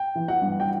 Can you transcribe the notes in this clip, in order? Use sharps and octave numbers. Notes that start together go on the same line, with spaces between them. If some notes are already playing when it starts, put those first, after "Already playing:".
Already playing: G5
E3
F#5
G2
G5